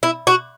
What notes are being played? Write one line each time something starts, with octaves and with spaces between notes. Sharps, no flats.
E4
F#4